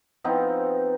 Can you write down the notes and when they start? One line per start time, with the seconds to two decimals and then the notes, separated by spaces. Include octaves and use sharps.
0.24 F3 B3 C4 D#4